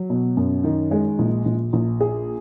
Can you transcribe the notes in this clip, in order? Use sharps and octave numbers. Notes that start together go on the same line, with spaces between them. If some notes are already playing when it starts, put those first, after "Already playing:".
Already playing: F#3
B2
F#2
D#3
G#3
A#1
A#1
A#1
G#4